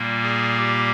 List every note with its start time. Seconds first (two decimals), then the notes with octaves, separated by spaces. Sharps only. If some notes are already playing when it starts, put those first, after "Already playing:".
Already playing: A#2 G3 A#3
0.23 G#4
0.57 G4